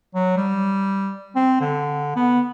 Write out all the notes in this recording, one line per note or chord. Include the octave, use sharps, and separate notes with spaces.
F#3
G3
C4
D3
B3